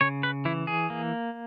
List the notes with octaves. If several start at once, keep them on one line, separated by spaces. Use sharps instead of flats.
C#3 C#5
B4
E3 E4
G#4
A#3